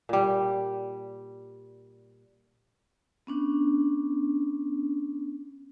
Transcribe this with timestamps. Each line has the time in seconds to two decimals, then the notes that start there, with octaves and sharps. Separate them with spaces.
0.09 A#2 G3
3.27 B3 C#4 D4